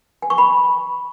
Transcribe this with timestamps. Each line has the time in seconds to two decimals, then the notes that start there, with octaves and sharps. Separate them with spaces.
0.22 G#5
0.30 C#6
0.38 B5